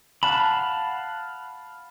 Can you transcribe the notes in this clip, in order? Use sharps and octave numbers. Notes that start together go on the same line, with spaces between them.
F5 F#5 A5 B5